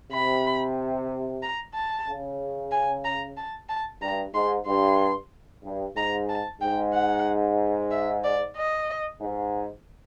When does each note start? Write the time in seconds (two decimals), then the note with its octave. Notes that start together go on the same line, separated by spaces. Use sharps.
0.12 C3 B5
1.42 A#5
1.74 A5
2.07 C#3
2.72 G#5
3.05 A#5
3.37 A5
3.69 A5
4.02 G2 A#5
4.34 G#2 C6
4.67 G2 C6
5.64 G2
5.96 G#2 A#5
6.29 A5
6.61 G#2 G5
6.94 F#5
7.91 E5
8.24 D5
8.56 D#5
9.21 G#2